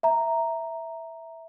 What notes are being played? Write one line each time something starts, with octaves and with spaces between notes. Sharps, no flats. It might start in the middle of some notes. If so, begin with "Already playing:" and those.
E5 A#5